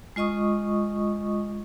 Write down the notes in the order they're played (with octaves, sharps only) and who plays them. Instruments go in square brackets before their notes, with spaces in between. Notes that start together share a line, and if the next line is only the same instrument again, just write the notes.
[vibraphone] G#3 F4 D#5 C#6 D#6